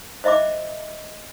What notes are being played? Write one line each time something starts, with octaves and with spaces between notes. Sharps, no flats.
C5 D#5 E5 B5 D6